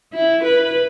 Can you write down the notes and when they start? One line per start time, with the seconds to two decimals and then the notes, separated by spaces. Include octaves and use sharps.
0.13 E4
0.44 B4